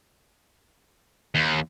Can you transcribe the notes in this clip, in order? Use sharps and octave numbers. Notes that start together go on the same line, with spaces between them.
D#2